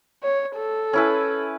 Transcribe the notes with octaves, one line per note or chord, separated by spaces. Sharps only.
C#5
A4
C#4 E4 B4